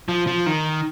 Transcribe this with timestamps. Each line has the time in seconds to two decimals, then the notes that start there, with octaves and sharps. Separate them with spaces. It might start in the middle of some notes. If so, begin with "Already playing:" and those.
0.09 F3
0.27 F3
0.46 D#3